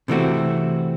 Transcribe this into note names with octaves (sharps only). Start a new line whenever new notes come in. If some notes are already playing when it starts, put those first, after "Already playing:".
C3 E3 A3 C4 F#4